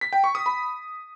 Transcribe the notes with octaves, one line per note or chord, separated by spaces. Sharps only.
B6
G5
C#6
D#6
B5